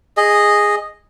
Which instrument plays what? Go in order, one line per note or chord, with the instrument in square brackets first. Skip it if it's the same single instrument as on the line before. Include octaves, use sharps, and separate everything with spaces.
[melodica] G#4 D#5